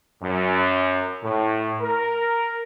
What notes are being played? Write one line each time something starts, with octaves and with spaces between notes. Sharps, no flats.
F#2
A2
A#4